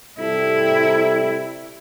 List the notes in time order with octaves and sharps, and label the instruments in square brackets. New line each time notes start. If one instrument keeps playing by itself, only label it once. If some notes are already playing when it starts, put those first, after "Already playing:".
[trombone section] C3 G3 A4 [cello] E4